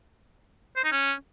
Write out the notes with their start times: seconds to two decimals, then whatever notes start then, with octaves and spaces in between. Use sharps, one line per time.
0.76 C5
0.84 D#4
0.92 C#4